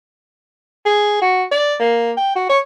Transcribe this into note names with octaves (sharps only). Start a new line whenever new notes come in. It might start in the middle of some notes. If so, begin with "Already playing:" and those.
G#4
F#4
D5
A#3
G5
F#4
C#5